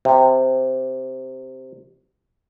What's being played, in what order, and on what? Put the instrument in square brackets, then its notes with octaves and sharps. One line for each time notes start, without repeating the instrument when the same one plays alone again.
[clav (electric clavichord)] C3